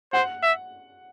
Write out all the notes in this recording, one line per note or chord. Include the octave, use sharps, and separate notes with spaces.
C5 F#5
E5